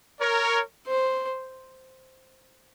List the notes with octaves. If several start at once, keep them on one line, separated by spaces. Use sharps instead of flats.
A#4 C#5
C5